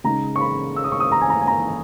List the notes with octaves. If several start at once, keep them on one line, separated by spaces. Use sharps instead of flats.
C#3 G#3 D#4 A#5
C#6
B5
E6
D#6
C#6
D#6
A#5
G#5
A#5
G#5
A#5